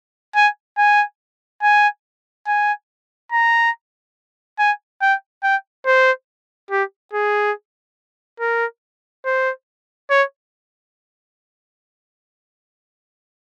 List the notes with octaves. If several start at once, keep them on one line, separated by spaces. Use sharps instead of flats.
G#5
G#5
G#5
G#5
A#5
G#5
G5
G5
C5
G4
G#4
A#4
C5
C#5